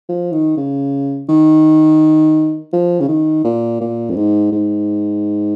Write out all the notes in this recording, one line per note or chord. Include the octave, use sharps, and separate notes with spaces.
F3
D#3
C#3
D#3
F3
C#3
D#3
A#2
A#2
F2
G#2
G#2